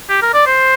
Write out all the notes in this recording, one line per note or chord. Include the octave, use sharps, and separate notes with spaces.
G4
A#4
D5
C5